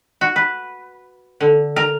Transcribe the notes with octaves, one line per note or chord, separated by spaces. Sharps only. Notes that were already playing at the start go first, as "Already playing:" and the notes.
F#4
B4
D3
A#4